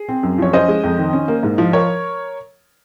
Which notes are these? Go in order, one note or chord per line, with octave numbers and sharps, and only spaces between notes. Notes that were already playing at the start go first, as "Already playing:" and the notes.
Already playing: G#4
C4
F#2
F3 C#5
C#4 C5 D#5
G#3
F2
D#3
C#4
A#3
G#2
F3
A#4 C#5